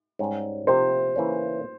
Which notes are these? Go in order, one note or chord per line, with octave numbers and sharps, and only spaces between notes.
G#2 G3 C#4 G4
C3 F3 C4 G4 C5
C#3 E3 A#3 C#4